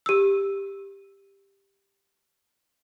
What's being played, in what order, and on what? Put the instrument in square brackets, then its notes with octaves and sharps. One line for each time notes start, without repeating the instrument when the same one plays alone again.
[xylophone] G4 E6